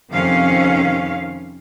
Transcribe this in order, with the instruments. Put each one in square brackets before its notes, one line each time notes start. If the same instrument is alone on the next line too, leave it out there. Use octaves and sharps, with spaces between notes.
[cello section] F2 C3 D#3 C#4 F5